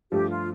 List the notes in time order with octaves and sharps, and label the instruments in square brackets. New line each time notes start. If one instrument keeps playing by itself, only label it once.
[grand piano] G2 F3 A3 [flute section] G4
[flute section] F4